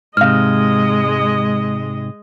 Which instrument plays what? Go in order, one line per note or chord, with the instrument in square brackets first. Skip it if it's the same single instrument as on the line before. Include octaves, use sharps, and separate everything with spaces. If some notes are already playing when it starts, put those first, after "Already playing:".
[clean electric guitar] G#2 C3 [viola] G#3 D#5 [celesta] F5 F6